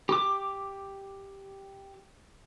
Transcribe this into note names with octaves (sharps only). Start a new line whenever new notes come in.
G4 D6